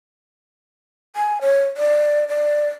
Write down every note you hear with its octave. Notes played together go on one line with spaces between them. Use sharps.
G#5
C#5
D5
D5